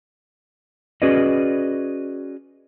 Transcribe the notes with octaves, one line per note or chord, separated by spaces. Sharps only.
C#4 F#4 G#4 B4 D5 D#5